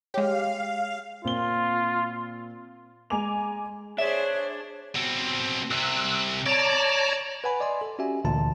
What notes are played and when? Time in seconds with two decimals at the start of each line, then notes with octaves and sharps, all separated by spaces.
0.14 G#3 G4 C#5 F5
1.25 A#2 C4 F4 G7
3.10 G#3 G#5 A#5 D6 F7
3.98 D4 G#4 C5 C#5 E5
4.95 B2 C4
5.71 C2 C3 E6 F#6
6.46 C#5 D5 A5 A#5
7.44 B4 F#5 G#5 B5
7.60 D5 D#5 G#5 C6
7.81 A4
7.99 C#4 F#4 G4 E5 G#5
8.25 D2 A#2 D3 E3 A5